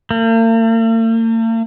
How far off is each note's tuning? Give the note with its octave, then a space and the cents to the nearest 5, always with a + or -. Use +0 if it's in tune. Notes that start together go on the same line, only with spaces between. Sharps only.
A#3 -45